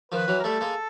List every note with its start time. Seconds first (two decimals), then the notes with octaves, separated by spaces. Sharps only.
0.12 D#3 F3 B4
0.28 E3 F#3
0.39 A#4
0.44 G3 A3 A4
0.61 G#3 A#3